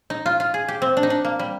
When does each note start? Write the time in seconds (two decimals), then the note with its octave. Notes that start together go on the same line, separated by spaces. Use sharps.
0.10 D#4
0.26 F4
0.40 F4
0.54 G#4
0.68 G4
0.82 C4
0.97 D4
1.03 D#4
1.10 D4
1.25 A#3
1.39 G3